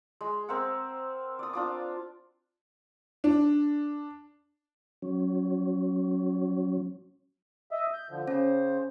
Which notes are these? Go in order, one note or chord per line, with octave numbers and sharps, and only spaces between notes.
G#3
C4 A#4 E5 F#5
D5 D#6
D4 F4 D6
D4
F#3 C#4
D#5 E5
G6
D3 F3
C#3 C#4 C5